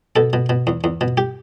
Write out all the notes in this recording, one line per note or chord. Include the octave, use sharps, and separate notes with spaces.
B2 A4
B2
B2
E2
E2
B2
G4